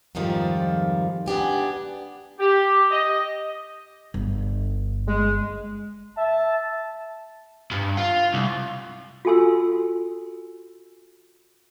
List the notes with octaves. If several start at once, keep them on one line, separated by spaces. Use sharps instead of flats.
F2 G#2 D#3 F3 G3
B3 D4 G4 G#5
G4
D#5
G1
G#3
E5 A5
G2
F4
C2
F4 F#4 A4 G#5 C6 E6